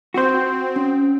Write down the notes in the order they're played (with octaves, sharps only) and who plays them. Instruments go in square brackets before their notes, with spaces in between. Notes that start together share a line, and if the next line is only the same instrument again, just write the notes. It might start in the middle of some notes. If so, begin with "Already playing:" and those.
[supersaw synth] C4 [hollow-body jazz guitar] F#4 C5
[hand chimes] C#4